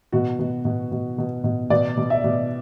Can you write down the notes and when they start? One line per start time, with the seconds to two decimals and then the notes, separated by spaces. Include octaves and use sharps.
0.13 B2 F#4
0.39 B2
0.65 B2
0.91 B2
1.18 B2
1.44 B2
1.70 B2 D5
1.97 B2
2.10 E5
2.24 B2